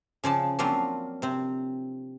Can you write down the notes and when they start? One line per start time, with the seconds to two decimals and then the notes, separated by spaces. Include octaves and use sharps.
0.24 C#3 F3 D5 A5
0.59 F3 F#3 A#3 C4 D4 F4
1.22 C3 C4